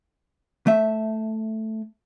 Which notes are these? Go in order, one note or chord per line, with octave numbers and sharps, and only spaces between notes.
A3 E5